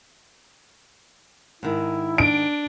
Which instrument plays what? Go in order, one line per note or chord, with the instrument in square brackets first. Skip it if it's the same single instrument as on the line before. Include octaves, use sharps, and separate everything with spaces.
[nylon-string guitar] G#2 D#3 [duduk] E4
[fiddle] D4 [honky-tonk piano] D7